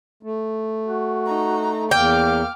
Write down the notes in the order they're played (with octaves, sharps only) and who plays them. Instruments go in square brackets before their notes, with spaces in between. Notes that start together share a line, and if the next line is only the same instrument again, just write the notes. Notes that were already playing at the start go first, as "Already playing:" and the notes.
[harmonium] A3
[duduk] F#4
[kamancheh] D#4 A#5
[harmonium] E2 [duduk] A#3 [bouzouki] G5 [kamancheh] D6 F6